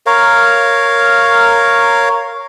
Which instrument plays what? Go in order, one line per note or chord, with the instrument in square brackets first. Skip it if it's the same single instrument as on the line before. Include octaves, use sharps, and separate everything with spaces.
[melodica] A#4 C#5 F5